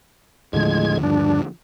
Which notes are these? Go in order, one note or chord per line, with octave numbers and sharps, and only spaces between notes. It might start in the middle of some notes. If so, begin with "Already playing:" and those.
D#2 A2 D3 F3 G#3 G#6
G2 D4